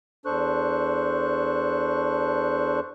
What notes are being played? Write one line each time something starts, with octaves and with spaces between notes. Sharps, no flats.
E2 D4 A4 C5 C#6 F#6